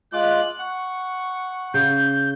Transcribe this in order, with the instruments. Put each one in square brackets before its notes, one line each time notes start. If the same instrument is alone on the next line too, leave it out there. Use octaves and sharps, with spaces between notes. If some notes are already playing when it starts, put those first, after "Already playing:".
[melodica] G#3 F4 D6 [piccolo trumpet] F#6
[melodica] F#5 [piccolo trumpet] C#6
[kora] C#3 [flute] G6